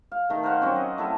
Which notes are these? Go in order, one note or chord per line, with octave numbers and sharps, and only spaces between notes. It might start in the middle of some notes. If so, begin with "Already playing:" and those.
F5
D#3 A3
A#4 C5 F5 F#5
F#3 C4 C#4 C5
D#5
A3 E4 A4